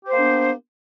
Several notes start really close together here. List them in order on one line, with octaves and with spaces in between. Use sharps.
G4 C5 A#3 B3 D4